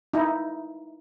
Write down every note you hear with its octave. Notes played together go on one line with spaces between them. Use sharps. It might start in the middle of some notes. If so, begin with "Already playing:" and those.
D#4 E4